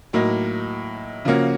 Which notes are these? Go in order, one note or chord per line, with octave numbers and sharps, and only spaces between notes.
A2 F#3 A#3 D#4
C#3 F3 A#3 C#4 F#4